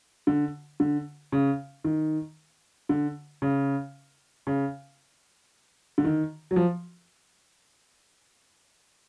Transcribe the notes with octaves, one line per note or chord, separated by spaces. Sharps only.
D3
D3
C#3
D#3
D3
C#3
C#3
D3
D#3
F#3
F3